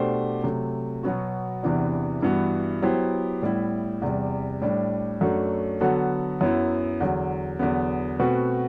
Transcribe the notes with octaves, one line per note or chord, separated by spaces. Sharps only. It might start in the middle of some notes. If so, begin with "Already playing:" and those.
Already playing: B2 A3 D4 G4 C5
C3 F#3 A3
B2 F#3 B3 F#4
E2 C3 E3 B3 D4
G2 E3 B3 F#4
F#3 B3 E4 G4 C5
A2 G3 B3 E4
E2 C3 G3
A2 G3 D4
F#2 F#3 A3 D4 F#4
D3 F#3 B3 F#4 A4
F#2 F#3 B3 E4
E2 D3 F#3
E2 D3 F#3 B3
B2 A3 C4 F#4 B4